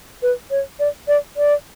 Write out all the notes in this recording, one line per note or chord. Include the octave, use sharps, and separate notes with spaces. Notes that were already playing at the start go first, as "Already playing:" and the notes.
B4
C#5
D5
D5
D5